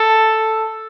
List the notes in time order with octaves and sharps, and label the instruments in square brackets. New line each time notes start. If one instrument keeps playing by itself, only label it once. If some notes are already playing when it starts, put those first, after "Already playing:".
Already playing: [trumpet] A4